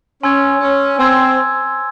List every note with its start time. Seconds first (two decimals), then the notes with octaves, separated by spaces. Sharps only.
0.23 C#4 G#5 C6 E6 G#6
0.61 C#4
0.99 C4 G#5 C6 E6 G#6